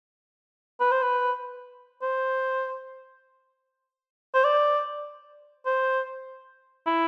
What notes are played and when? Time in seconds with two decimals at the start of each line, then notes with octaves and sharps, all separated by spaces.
0.80 B4
0.92 C5
1.02 B4
2.02 C5
4.35 C5
4.44 D5
5.66 C5
6.87 E4